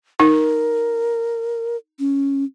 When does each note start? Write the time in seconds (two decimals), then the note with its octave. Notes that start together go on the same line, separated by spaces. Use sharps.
0.20 D#4 A#4
1.99 C#4